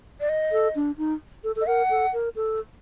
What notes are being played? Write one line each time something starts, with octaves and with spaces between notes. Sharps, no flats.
D5
D#5
A4
D4
D#4
A4
A4
D#5
A#4 F#5
A4
A#4
A4